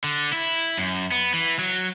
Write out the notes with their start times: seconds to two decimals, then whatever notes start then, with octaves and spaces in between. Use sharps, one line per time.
0.04 D3
0.33 E4
0.78 F#2
1.12 B3
1.34 E3
1.59 F#3